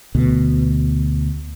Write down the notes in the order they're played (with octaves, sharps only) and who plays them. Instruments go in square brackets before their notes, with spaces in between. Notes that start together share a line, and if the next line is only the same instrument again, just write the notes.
[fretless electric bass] D2 B2